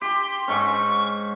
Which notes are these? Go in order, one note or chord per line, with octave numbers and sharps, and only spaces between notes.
G4 C6
G#2 C#4 C#6